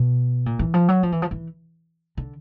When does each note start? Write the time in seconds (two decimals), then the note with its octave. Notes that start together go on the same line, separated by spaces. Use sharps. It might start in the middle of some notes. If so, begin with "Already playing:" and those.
Already playing: B2
0.46 A#2
0.59 E3
0.74 F3
0.88 F#3
1.03 F3
1.12 E3
1.22 F3
1.31 E3
2.17 D3